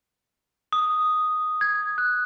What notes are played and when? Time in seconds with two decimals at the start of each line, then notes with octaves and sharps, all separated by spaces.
0.73 D#6
1.61 G#6
1.98 F#6